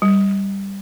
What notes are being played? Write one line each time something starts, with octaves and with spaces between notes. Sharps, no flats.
G3